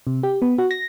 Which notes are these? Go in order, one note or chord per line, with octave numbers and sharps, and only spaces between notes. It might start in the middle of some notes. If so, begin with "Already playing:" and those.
C3
G4
B3
F#4
A#6